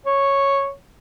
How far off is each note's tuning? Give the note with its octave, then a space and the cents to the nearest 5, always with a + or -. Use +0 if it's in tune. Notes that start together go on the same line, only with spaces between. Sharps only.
C#5 -5